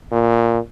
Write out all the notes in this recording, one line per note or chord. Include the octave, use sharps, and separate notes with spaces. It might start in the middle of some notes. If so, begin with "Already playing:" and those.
A#2